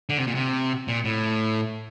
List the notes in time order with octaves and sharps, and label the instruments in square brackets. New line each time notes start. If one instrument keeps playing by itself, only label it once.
[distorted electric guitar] D3
C3
A#2
C3
A#2
A2